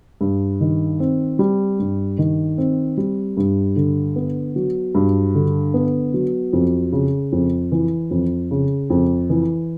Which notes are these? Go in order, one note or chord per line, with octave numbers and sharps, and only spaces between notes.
G2
D#3
C4
G3
G2
D#3
C4
G3
G2
D3
B3
F#3
G2
D3
B3
F#3
F2
C#3
F2
E3
F2
C#3
F2
E3